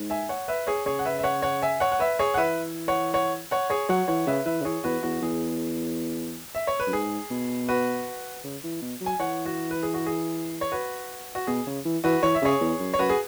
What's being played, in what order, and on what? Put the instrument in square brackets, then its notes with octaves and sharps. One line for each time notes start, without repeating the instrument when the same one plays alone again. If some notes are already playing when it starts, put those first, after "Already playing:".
Already playing: [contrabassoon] G#2
[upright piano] E5 G#5
C#5 F#5
B4 E5
G#4 C#5
[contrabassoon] C#3 [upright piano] G#4 C#5
[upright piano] F#5
B4 E5
E5
C#5 F#5
C#5 F#5
E5 G#5
C#5 F#5
F#5
B4 E5
G#4 C#5
F#5
[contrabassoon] E3 [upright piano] B4 E5
[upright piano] C#5 F#5
C#5 F#5
C#5 F#5
G#4 C#5
[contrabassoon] F#3 [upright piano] C#5 F#5
[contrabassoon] E3 [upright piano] C#5 F#5
[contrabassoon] C#3 [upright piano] B4 E5
[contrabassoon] E3 [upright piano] B4 E5
[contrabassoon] C#3
[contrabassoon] E3 [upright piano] G#4 C#5
[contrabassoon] E2 [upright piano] F#4 B4
[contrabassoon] E2 [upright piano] F#4
[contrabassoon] E2 [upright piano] G#4
[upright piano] E5
C#5
B4
[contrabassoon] F#2
[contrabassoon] G#2 [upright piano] G#4
[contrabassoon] B2
[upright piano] F#4 B4
[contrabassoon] C#3
E3
B2
F#3
[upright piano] G#5
[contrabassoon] E3 [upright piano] C#5 F#5
[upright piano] F#4
B4
G#4
F#4
G#4
C#5
F#4 B4
F#4
[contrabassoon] B2 [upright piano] G#4
[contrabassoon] C#3
E3
[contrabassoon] E3 [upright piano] F#4 B4
[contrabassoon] E3 [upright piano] C#5
[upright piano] E5
[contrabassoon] C#3 [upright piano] G#4 C#5
[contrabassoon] E2
F#2
[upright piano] C#5
[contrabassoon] F#2 [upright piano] F#4 B4
[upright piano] G#4